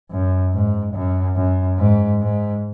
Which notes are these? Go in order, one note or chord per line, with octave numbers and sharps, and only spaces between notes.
F#2
G#2
F#2
F#2
G#2
G#2